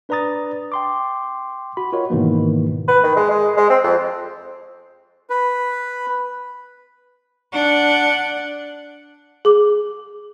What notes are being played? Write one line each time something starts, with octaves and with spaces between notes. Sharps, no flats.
D4 B4 D5 A#5 D#6 A6
G5 C6 D6
F#4 B5
F4 F#4 A#4 C#5 D#5
G#2 B2 D#3 E3 A#3
B4
D#3
G#3
G#3
G#3
C4
F2
B4
D4 F#5
G#4 D6